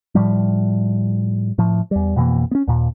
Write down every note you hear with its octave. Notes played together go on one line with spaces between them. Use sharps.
A2 F3 G3
A2 F3
E2 G3
F2 B2 E3 A#3
B3 C#4
D#2 A#2